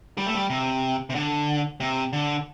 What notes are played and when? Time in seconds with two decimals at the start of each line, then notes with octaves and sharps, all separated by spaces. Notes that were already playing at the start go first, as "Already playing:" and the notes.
0.18 G3
0.26 A3
0.35 G3
0.50 C3
1.10 C3
1.15 D3
1.80 C3
2.13 D3